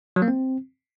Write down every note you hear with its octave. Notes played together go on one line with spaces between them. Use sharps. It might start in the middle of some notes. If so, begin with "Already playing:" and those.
F#3
A#3
C4